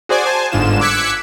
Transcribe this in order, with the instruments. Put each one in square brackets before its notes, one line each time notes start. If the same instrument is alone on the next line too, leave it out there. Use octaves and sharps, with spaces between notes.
[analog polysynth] F#4 G#4 C5 D5 G#5
C5 G#5 A5
G1 G#2 D3 F4 E7
D6 E6 F#6 G#6 B6 C#7